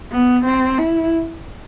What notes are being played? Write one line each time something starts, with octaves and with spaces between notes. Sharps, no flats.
B3
C4
E4